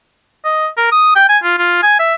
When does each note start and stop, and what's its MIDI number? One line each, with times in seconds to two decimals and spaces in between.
0.45 0.68 75
0.77 0.91 70
0.92 1.11 87
1.16 1.24 79
1.29 1.38 80
1.44 1.55 65
1.58 1.83 65
1.83 1.99 80
1.99 2.15 76